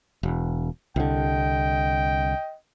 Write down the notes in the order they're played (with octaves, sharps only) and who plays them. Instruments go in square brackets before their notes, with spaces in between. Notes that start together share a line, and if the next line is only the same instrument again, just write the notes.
[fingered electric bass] E1
[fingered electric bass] C2 D3 [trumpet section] D#5 G5